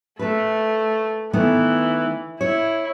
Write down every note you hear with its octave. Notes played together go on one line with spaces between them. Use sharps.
A3 A4 B4
D#3 E3 A3 B3
E4 C#5